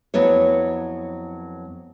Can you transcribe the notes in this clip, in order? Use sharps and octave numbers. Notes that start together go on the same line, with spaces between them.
F2 F#3 B3 E4 C#5